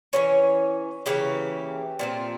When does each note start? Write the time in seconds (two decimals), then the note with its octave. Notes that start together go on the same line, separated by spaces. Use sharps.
0.13 E3 G#3 C#4 C#5
1.06 C#3 E3 A#3 G4
1.99 A#2 F3 C4